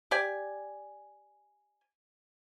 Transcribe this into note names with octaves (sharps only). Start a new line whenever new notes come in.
G4 D5 G#5